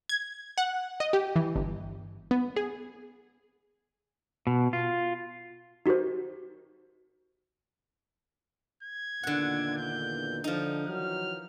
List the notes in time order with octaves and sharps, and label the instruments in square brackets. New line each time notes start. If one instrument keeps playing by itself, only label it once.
[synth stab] G#6
F#5
D#5
G4
E3
G1
B3
G#4
[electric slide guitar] B2
F4
[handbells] D#4 F#4 G4 A#4 C5
[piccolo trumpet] G#6
[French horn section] E2 A#2 D#3 [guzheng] D3 F#5
[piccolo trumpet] G6
[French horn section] D3 [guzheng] F3 D#4
[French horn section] D#3 E3 F#3 [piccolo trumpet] F6